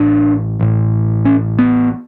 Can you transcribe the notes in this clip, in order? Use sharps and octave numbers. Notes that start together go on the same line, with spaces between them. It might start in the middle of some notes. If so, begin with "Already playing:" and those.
Already playing: A1 A2 D4
A1 A2
C#4
B3